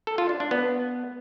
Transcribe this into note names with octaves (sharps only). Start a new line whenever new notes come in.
A4
F4
D4
D4
B3